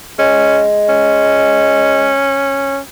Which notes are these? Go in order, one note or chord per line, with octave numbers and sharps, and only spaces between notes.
G#3 C#4
C#4